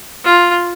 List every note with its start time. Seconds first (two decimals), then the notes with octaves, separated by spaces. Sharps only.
0.24 F4